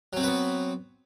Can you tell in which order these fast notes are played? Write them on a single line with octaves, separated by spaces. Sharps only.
F#3 C4 F#4 B4 B3